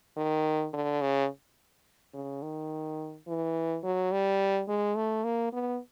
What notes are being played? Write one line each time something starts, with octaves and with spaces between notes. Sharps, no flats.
D#3
D3
C#3
C#3
D#3
E3
F#3
G3
G#3
A3
A#3
B3